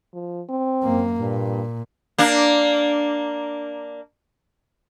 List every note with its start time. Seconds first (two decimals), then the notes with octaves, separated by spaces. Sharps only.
0.14 F3
0.50 C4
0.83 F#2 A#3
1.20 G2 A#2
2.18 A#3 D4